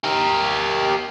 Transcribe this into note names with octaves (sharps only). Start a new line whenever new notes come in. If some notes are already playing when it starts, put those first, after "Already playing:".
G4 A#4